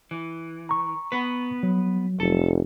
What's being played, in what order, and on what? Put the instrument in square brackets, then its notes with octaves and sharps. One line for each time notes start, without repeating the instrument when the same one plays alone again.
[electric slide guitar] E3
[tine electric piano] A#5 C#6
[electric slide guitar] B3 B4
[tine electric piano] F#3
[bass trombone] F1 [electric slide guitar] A4